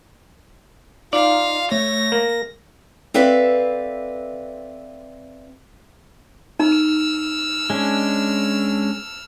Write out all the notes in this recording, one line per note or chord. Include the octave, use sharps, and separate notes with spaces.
D#4 F4 D5 F5
A3 C#5 A#6
A#3
C4 A4 B4 D5 E5 F5
D#4 E6 F6
G#3 C#4 D4